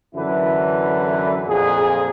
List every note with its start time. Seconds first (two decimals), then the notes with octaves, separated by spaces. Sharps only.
0.15 F#2 D3 E3 E4 B4
1.48 F2 A#2 G#4